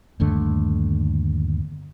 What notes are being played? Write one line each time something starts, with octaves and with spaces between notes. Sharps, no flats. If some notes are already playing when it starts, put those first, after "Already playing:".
G1 D#2 D3 A3